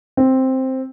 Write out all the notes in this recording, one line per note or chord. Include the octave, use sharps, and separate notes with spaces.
C4